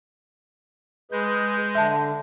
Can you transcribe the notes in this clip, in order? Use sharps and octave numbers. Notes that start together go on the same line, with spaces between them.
G#3 G#4 B4 G6
D3 E5 A5